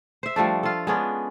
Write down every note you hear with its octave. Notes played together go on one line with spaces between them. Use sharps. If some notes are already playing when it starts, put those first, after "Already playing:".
C5 E5
F3 G3 A3 D4
F4 A4
G#3 B3 C#4 D4